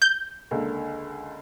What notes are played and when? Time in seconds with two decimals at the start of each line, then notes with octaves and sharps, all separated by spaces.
0.02 G6
0.51 C#2 D3 A#3